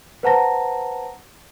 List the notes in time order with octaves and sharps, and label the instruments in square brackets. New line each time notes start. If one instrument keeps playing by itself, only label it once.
[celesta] B4 C5 F#5 A5 A#5 A#6